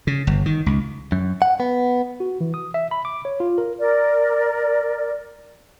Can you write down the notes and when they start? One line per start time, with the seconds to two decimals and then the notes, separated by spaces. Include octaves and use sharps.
0.07 C#3
0.27 G1
0.46 D#3
0.66 C#2
1.12 F#2
1.42 F#5
1.60 B3
2.20 F#4
2.41 E3
2.54 D#6
2.74 E5
2.91 B5
3.05 D6
3.25 C#5
3.40 F4
3.58 A#4
3.79 A#4 D5